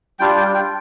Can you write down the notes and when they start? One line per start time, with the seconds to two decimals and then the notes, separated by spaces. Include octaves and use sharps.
0.19 G3 D4 F4 G5
0.37 G5
0.54 G5